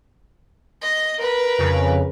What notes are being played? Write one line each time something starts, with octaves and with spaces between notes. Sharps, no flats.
D#5
A#4 B4
F2 C#3